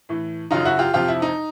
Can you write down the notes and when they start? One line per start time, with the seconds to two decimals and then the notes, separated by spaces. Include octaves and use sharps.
0.09 A2 E3
0.51 F#2 C#3 F#3 D#4 F4
0.65 E4 F#4
0.79 F4 G4
0.94 F2 C3 F3 F4 G4
1.08 E4
1.22 D#4